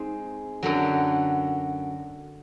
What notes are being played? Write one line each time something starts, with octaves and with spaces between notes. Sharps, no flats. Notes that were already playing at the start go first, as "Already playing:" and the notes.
Already playing: G#3 C4 D#4
F#2 D3 F#3